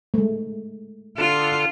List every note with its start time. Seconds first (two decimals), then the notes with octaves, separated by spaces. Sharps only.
0.14 G#3 A3
1.18 D3 D4 F4 A4